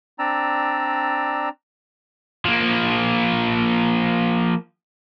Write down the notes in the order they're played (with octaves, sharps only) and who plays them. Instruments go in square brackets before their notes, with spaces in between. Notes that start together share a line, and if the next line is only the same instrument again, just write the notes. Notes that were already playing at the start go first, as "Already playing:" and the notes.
[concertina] C4 D4 D5 A#5 E6
[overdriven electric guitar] F3 A#3